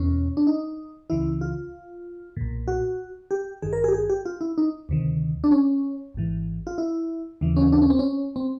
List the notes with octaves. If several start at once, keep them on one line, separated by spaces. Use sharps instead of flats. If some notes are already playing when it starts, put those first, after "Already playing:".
Already playing: E2 B2 C#4
D4
D#4
C#2 C#3 E3 E4
F4
B1 A#2
F#4
G4
G#1 G2 D#3 G#4
A#4
G#4
G4
G#4
G4
F4
E4
D#4
D2 C3 D#3
D4
C#4
G#1 G#2 E3
F4
E4
D#2 C#3 E3
C#4
D4
C#4
C4
C#4
C4